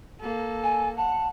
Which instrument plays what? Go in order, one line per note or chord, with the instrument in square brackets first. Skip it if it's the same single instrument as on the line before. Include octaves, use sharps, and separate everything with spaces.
[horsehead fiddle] A#3 A4
[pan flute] G#5
[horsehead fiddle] F#5 [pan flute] A5